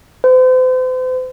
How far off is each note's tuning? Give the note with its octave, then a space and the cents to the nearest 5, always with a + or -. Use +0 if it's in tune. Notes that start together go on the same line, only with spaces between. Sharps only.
C5 -40